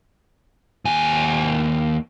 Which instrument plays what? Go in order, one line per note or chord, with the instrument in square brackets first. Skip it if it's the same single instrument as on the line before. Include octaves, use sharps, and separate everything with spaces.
[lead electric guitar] D#2 G#5